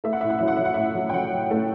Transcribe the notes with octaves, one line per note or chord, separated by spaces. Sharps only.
A3 E5
F#5
A2 E5
F#5
F#3 E5
F#5
F#3 E5
F#5
A2 E5
F#3
G5
F#3 F#5
F#3
A3